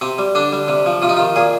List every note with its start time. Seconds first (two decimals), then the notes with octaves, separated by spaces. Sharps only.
0.01 C3 C4
0.19 G3
0.35 D3 D4
0.52 G3
0.68 C3
0.86 F3
1.02 C3 F4
1.09 D#4
1.17 F4
1.19 D#3
1.36 A#2 G#4